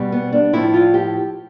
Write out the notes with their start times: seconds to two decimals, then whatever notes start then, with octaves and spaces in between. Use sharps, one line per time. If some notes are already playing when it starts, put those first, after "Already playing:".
Already playing: B2 G3
0.12 B3
0.32 D4
0.53 A2 F3 E4
0.74 F4
0.94 G4